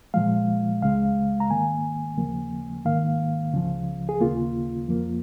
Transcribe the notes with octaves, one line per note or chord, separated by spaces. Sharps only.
A#2 F3 G#3 F5
C#2 C#3 G#3 F5
A#5
G#2 D#3 A#3 G#5
D#2 C#3 F3 A#3
G#2 D#3 A#3 F5
C#2 C#3 F3
G#4
D#2 C#3 A#3 F4
F2 F3 A#3